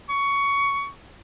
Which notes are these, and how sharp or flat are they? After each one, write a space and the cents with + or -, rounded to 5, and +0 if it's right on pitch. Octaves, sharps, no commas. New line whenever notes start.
C#6 +15